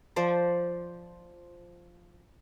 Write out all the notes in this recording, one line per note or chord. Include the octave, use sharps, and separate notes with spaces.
F3 C5 D5